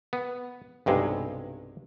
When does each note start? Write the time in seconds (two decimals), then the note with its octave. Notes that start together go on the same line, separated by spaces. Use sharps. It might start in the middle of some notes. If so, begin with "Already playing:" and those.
0.13 B3
0.86 B1 G2 C3 G#3